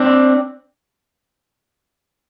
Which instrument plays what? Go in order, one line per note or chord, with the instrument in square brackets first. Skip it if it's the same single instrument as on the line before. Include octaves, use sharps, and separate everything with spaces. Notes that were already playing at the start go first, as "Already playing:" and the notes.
Already playing: [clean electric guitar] C4 D4